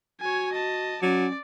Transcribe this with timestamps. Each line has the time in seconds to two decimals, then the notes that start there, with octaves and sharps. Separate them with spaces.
0.21 F#4 C#5 G#5
0.53 D#5 A5
1.02 F#3 C#4 D5